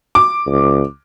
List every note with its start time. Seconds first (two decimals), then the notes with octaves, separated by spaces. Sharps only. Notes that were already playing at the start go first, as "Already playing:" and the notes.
0.15 D6
0.47 C#2